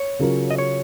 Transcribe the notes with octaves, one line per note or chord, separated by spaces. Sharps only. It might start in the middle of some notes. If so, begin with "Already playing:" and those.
Already playing: C#5
C#3 F#3 C#4 F4 A#4
D#5
C#5